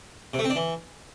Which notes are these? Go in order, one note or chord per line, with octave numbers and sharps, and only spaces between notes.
C3
A3
C4
D4
E3